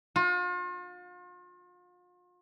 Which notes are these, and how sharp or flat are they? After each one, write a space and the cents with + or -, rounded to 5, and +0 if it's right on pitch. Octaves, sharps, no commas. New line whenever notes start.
F4 +40